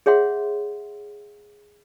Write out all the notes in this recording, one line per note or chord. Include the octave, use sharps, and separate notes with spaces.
G#4 C#5 E5 F#5 C6